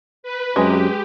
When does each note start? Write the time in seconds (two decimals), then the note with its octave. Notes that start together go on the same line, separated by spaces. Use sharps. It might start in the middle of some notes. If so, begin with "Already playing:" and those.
0.23 B4
0.56 F#2 C3 G#3 G4